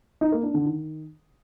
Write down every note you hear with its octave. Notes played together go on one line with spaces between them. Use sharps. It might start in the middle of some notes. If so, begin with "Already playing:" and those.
D#4
A#3
D4
D3
D#3